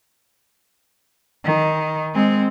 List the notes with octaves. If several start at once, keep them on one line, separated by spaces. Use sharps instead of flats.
D#3
G#3 C4